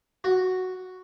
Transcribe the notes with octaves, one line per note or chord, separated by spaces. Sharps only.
F#4